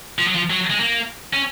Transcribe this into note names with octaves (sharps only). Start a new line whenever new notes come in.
F3
F#3
F3
F#3
G#3
A#3
C#4